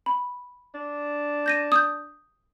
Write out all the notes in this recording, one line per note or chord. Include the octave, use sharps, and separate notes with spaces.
B5
D4
G6 A#6 D#7
D#6 G6